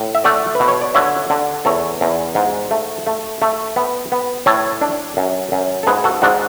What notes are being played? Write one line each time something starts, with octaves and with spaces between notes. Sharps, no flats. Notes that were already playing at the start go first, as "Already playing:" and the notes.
Already playing: A2
E5
A3 D5 F#5
B4
B2
C#5
D5
D3 C#5 E5
D3
E2 A4 C#5
E2
G#2
A3
A3
A3
B3
B3
A2 A4 C#5
D4
F#2
F#2
A4
G#2 G#4 B4
F#4 A4
G#2 D4 F#4